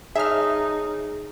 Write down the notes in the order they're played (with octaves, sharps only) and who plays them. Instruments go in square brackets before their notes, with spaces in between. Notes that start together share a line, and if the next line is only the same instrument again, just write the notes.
[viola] D#4 [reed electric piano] G#4 [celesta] C#5 A5 D#6 [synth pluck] E5 F6